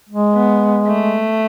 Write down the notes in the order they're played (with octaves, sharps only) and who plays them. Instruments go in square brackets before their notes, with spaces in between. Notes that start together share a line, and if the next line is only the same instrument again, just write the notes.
[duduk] G#3
[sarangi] B3
A3